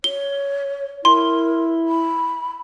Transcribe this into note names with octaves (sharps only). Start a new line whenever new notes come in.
C#5 G7
E4 A#4 C6
B5